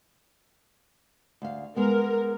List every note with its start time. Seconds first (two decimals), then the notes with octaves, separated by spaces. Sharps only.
1.42 D2 F5
1.76 G#3 B3 A#4